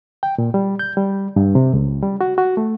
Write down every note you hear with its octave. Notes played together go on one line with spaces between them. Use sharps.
G5
A#2
G3
G6
G3
G2
C3
C#2
G3
F#4
F#4
A3